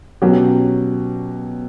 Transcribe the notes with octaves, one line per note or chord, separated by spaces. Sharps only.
B2 F#3 C#4 G4